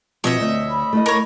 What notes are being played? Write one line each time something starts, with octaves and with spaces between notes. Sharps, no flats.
B2 F3 C4 C#5 D#5 E5
D2
B5
A3 E4 D#5
A#4 C#5